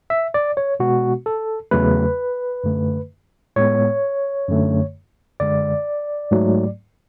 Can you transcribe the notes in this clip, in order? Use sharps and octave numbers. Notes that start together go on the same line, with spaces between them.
E5
D5
C#5
B2 G#3 B3 F#4
A4
E2 C#3 F#3 A3 B4
F#2 D3 A3
A2 G#3 B3 C#5
F#2 D3 A3
F#2 D3 G#3 D5
G#2 F#3 A3